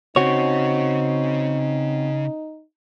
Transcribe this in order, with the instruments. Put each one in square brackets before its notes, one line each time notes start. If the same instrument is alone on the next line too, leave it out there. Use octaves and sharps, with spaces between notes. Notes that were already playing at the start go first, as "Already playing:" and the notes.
[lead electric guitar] C#3 [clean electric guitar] C4 F#4 C#5 [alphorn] D#4